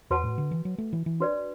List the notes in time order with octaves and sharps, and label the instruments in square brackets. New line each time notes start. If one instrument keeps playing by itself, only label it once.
[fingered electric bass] E2 [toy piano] F#4 B4 F#5 A5
[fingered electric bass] A2
D3
E3
F#3
A3
E3
E3
[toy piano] D4 F#4 B4 D5